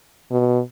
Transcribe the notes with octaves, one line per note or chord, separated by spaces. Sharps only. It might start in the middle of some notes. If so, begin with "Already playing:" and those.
B2